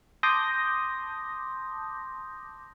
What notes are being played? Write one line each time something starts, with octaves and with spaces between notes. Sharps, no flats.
A5 C6 D6 D#6 G6 A#6